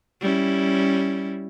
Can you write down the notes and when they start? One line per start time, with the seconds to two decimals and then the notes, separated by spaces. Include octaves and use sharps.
0.21 G3 C#4 E4